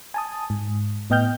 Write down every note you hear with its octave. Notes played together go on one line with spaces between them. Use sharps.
G#5 A5 D#6
G#2
A2 B3 D#5 G5 F6 G6